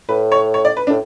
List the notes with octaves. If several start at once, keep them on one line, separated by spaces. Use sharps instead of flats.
A2 B4
C#5
C#5
D5
B4
D4
A2